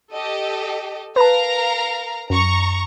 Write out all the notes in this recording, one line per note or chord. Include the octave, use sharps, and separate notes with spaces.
G4 A4 D#5
A#4 B4 F5 A5 A#5
F#2 A#5 C#6